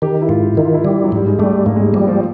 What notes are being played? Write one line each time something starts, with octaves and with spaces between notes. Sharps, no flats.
D#3 G4
E4
G#2 F4
D#3 E4
F4
E4
G3 E4
F#3
G#2 G3
G#3
G3 A3
G#2 A#3
G#3
G3
F3 G3
F3